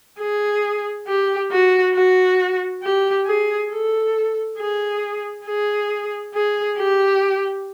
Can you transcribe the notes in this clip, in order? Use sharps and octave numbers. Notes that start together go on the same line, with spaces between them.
G#4
G4
F#4
F#4
G4
G#4
A4
G#4
G#4
G#4
G4